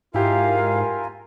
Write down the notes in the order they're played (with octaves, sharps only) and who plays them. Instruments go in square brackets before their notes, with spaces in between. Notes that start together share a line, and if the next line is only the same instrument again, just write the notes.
[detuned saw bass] G#2 [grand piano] E4 G4 [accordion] F4 A#4 G#5 [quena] F5